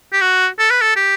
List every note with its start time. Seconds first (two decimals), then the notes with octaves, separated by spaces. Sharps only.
0.13 G4
0.21 F#4
0.59 A4
0.71 B4
0.82 A4
0.96 G4